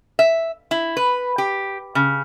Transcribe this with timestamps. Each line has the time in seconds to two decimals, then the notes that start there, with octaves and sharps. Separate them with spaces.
0.19 E5
0.71 E4
0.97 B4
1.38 G4
1.95 C#3